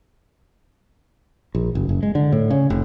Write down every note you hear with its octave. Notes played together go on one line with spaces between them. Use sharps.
A#1
F#1
F#1
G#3
D3
A2
C#3
F1